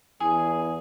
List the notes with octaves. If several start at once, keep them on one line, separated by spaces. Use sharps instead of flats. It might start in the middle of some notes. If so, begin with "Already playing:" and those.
E2 G#4